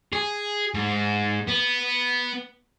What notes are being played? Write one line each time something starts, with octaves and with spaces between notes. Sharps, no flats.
G#4
G#2
B3